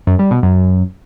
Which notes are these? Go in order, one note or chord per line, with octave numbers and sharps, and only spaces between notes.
F#2
G3
B2
F#2